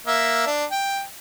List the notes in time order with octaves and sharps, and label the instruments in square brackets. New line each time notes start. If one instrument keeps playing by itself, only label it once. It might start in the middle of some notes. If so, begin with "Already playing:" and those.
[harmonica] A#3 E5
D4
G5